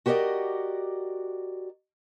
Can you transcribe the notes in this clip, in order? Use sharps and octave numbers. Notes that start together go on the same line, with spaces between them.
F#4 G4 A#4 B4 D5 D#5